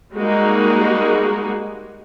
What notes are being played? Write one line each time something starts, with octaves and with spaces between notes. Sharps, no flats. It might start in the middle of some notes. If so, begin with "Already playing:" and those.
G3 G#3 A#3 D#4 F#4 G#4